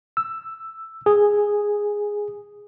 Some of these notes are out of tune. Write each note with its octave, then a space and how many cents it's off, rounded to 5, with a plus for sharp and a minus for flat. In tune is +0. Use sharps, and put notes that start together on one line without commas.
E6 +5
G#4 -5